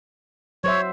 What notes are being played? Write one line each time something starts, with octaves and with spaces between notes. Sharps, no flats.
F#3 C5 C#5 E5